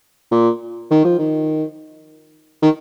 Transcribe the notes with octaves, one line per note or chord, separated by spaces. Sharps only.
A#2
D#3
F3
D#3
D#3